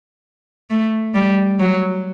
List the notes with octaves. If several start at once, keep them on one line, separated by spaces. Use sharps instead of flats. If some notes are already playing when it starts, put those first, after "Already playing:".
A3
G3
F#3